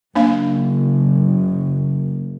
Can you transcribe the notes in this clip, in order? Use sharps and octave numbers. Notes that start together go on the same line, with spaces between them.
F#1 A#3 D4 F5